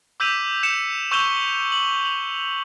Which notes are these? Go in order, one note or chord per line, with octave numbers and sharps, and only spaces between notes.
D6 E6 G6 B6 D#7 F7
G6 C#7 E7
C#6 E6 G6 E7 F7 G7
F#7
F7 F#7